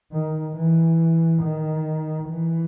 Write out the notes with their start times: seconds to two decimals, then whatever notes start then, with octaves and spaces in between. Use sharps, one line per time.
0.13 D#3
0.56 E3
1.42 D#3
2.28 E3